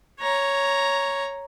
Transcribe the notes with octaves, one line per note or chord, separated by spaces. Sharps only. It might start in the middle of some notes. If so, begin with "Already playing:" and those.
C#5 A#5